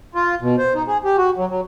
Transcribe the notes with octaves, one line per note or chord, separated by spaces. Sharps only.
F4
B2
C5
D#4
G#4
G4
F#4
F#3
F#3